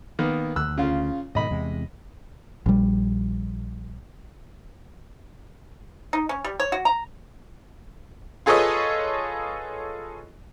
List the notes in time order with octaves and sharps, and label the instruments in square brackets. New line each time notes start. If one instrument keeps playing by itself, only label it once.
[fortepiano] D#3 A#3 B3
[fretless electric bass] D2 [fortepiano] E6 F#6
[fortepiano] C#3 F4
[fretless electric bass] G#2 B2 D#3 [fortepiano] D#5 B5
[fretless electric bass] E2 C3 G#3
[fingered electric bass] A#1 G3
[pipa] D#4
C#4
G3
C#5
F#4
A#5
[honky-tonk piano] F4 G#4 A4 B4 C#5 D#5